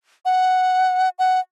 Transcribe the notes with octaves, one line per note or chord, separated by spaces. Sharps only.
F#5
F#5